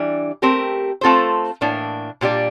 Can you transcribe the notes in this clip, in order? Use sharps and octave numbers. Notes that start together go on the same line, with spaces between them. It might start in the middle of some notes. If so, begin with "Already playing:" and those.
Already playing: E3 G3 D4
A3 C4 G4 A#4
A3 C4 F4 A4 C5
A2 E3 A#3 D4
A#2 G3 D4 G4 D5